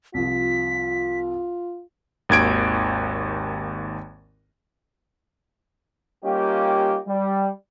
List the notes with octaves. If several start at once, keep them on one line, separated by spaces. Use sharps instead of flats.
C2 F3 F4 B6
G#1 D#2 G#6 D7
G3 A#3 C#4 D#4 F4 G4
G3